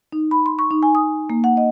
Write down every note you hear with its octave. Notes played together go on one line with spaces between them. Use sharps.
D#4
B5
C6
C#6
D#4
G#5
D#6
A#3
F#5
D#5